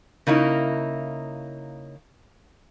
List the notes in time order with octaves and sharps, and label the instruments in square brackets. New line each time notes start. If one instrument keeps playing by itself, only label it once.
[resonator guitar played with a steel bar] C#3 A#3 D#4 E4